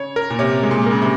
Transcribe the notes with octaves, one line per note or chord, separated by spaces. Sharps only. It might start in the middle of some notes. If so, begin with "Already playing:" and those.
Already playing: C#3 C#5
A#4
A#2
C3 C#5
G#3
A#2
C#3 A#4
C3